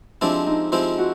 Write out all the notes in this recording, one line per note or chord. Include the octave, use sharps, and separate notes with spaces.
F3 G#3 C4 D4 E4 G4
D#4
F3 G#3 C4 E4 F4 G4
F#4